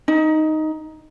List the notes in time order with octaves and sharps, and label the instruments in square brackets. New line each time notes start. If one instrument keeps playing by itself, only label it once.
[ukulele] D#4